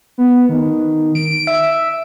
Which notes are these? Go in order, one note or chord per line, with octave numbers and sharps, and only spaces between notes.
B3
D#3
D7
E5